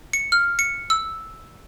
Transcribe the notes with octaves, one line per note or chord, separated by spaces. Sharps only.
C#7
F6
C#7
E6